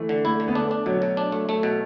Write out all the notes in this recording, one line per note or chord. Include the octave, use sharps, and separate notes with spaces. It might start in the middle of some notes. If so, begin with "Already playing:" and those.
Already playing: E3 A3
D3
A3 E4
D3
B3
A3 D4
D4
B2 F#3
B2
D4
A3
A3
B2